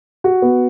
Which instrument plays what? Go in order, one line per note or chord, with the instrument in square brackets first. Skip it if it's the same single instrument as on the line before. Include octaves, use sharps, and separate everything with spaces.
[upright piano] F#4
B3